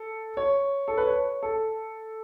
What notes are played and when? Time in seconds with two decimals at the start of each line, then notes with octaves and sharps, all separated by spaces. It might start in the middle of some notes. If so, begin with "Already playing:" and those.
Already playing: A4
0.37 C#5
0.88 A4
0.97 B4
1.07 C#5
1.43 A4